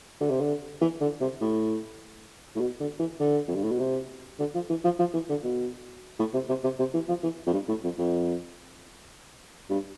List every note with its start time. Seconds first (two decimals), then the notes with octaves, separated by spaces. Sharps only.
0.21 D3
0.30 C3
0.41 D3
0.81 E3
1.01 D3
1.21 C3
1.41 A2
2.56 A2
2.60 B2
2.80 D3
2.99 E3
3.20 D3
3.48 F2
3.56 G2
3.64 A2
3.71 B2
3.79 C3
4.39 D3
4.54 F3
4.70 E3
4.84 F3
4.99 F3
5.14 E3
5.29 D3
5.44 B2
6.19 A2
6.33 C3
6.49 C3
6.63 C3
6.79 C3
6.94 E3
7.08 F3
7.23 E3
7.46 F2
7.53 G2
7.68 A2
7.84 F2
7.98 F2
9.70 G2